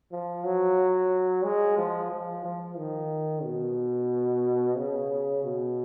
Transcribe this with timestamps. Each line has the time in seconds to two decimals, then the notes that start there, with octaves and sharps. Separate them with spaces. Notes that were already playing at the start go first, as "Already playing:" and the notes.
0.12 F3
0.45 F#3
1.45 G#3
1.78 F3
2.11 F3
2.44 F3
2.78 D#3
3.44 B2
4.77 C#3
5.44 B2